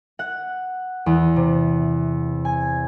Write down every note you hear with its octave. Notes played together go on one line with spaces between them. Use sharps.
F#5
E2
C3
G#5